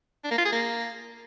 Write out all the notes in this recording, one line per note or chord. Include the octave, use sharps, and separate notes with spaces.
D4
A#3
F4
G#4
A#3